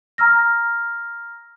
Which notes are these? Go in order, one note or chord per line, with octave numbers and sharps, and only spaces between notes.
A#5 E6 F6 A#6